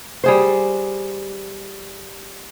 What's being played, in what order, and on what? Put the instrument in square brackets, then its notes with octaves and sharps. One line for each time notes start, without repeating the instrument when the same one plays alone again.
[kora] G3 G#4 C5